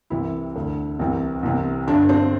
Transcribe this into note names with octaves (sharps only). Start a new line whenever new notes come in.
C2 C3 E3 E4
D2 D3
C2 C3 E3
C2 C3 E3
G1 G2 D3 D4
C4